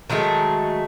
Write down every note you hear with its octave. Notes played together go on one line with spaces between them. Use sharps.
D#3 F#3 G#3 A3